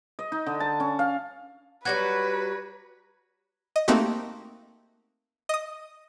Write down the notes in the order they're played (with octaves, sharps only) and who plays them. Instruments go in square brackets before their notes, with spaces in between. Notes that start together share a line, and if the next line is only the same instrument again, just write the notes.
[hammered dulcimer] D#5
D#4
D3
A5
C#4
F5
[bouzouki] F#3 G3 F#4 [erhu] B4 [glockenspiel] F#6 G#6 A#6
[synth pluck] D#5
A3 A#3 C4 D#4 F#4 G4
D#5 D#6